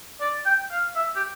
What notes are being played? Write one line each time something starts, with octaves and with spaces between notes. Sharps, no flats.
D5
G5
F5
E5
G4